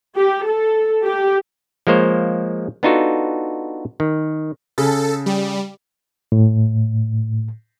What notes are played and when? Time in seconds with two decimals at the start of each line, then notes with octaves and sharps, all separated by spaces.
0.17 G4
0.47 A4
1.06 G4
1.87 F3 G#3 A#3 C5 C#5
2.83 B3 D4 D#4 F4 F#4 A4
4.00 D#3
4.78 C#3 G#4 A4
5.26 G3
6.32 A2